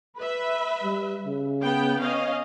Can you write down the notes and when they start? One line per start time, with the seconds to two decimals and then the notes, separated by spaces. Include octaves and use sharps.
0.17 B4 E5
0.83 G3
1.26 C#3
1.62 B3 G5
2.01 B3 C#4 D#5 F5